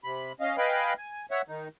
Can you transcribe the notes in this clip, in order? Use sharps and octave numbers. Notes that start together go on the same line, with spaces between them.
C3 B5
C#4 D#5 F5
B4 D#5 F5 G5 G#5 B5
G#5
C#5 E5 F#5
D#3 D#4